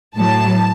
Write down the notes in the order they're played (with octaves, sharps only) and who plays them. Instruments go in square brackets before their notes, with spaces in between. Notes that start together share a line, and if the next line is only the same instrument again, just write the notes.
[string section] A2 F#3 A5